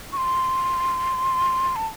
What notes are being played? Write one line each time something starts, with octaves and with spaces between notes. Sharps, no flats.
C#6
C6
A5